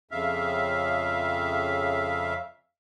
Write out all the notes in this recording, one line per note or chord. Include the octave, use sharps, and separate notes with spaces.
F2 C#3 E5 F5